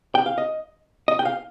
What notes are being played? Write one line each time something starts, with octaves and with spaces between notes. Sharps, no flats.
G5
F5
D#5
D#5
G5
F5